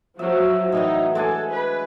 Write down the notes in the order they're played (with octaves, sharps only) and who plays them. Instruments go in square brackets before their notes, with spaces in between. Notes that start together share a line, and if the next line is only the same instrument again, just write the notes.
[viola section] F3 F#3 F#4 [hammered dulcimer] E5
[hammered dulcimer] A2 E3 F#3 [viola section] D#4
[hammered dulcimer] G#3 D4 G#5 [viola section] A4
[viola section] B4